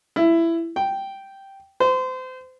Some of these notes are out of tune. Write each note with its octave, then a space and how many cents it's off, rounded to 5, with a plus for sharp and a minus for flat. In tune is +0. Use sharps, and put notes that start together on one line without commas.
E4 +15
G5 -5
C5 -30